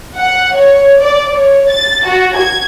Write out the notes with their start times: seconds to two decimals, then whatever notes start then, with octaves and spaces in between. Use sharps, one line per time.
0.17 F#5
0.55 C#5
1.00 D5
1.35 C#5
1.68 A6
2.06 F#4
2.36 G#6